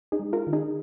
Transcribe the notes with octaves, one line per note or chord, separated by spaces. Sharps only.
D#4 G#4
G#3
F4 A#4
D#3
D#4 G#4